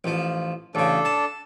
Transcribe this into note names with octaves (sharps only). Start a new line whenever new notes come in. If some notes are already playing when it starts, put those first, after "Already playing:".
A1 F3
A1 C#3 D4 A4
A5